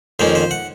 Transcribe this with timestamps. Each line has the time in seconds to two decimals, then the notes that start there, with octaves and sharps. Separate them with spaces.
0.19 F2 D#3 A#3 C#4 C5
0.35 C5
0.51 F#5